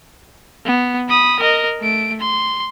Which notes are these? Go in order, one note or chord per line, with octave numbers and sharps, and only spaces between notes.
B3
B5 D#6
A#4 D#5
A3 D7
C6